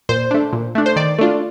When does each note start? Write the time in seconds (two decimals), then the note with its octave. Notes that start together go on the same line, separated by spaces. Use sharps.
0.09 A#2 C5
0.31 A3 D4
0.53 A#2
0.75 A3 D4
0.86 C5
0.96 D#3 D5
1.18 A3 D4 F4